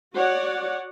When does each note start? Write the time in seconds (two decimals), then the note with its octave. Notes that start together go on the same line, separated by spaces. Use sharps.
0.16 F#4 C#5 D5 F#5